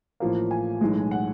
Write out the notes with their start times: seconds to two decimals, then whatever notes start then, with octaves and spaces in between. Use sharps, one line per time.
0.20 A1 A2 F3 A#3
0.51 G#5
0.81 B1 A2 E3 G#3
1.11 F#5